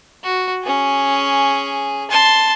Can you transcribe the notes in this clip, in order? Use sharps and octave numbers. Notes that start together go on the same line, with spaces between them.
F#4
C#4 G#4
A5 C6